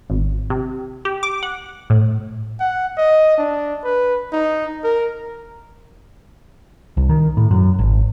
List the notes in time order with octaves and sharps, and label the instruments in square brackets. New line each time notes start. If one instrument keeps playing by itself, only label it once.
[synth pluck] G#1
C3
G4
D6
F#5
A2
[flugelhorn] F#5
D#5
D4
B4
D#4
A#4
[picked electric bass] C2
D#3
A2
F#2
G#1